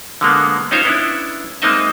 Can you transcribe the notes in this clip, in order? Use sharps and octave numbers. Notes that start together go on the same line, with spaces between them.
D3 G#3 A#3 B3
C#4 D#4 F4 C5 C#5
B3 C#4 D4 E4
G#3 A#3 C4 D#4 D#5 E5